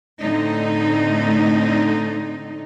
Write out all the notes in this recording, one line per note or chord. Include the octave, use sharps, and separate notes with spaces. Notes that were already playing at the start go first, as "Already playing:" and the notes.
A2 D3 A3 C4 D#4